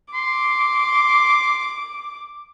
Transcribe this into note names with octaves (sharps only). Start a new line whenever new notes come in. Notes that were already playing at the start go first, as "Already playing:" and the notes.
C6 D6